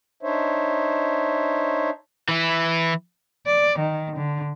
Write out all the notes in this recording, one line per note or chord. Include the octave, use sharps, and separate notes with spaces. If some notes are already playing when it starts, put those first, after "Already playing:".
D4 D#4 C5 C#5 E5
E3 E4
D5
D#3
D3